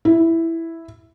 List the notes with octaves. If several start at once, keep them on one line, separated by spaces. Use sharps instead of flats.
E4